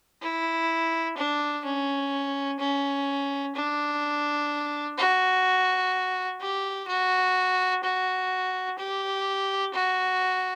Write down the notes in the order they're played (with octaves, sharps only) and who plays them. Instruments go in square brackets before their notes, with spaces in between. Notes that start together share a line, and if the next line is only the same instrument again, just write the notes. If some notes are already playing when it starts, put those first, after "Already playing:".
[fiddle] E4
D4
C#4
C#4
D4
F#4
G4
F#4
F#4
G4
F#4